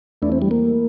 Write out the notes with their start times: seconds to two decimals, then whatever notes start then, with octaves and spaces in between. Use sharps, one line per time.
0.22 E2 E3 A3 D4 E4
0.32 C4
0.42 G3
0.51 A#3